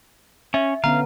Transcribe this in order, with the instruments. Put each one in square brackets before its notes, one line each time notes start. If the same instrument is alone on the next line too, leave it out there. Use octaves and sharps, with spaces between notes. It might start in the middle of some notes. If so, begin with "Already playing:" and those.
[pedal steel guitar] C#4 [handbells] E5
[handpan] D3 B3 C#4 [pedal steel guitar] F5 [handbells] A#5